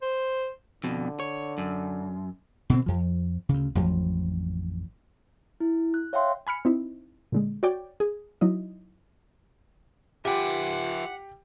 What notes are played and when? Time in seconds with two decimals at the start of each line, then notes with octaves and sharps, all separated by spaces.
0.02 C5
0.84 F2 B2 D3
1.20 C#5
1.58 F#2
2.70 B2 D3 C4
2.86 F2 F3
3.49 D2 C#3
3.75 A1 F2 F3 F#3
5.60 E4
5.94 F#6
6.13 C#5 E5 F5 G5 C6
6.47 G#5 B5 F6 C#7
6.65 C4 D#4 E4
7.32 A#2 D3 G#3
7.63 F#4 C#5 D5 G5
8.00 G#4
8.41 F#3 D#4 E4 D#5
10.25 F4 G4 E5 F#5 G#5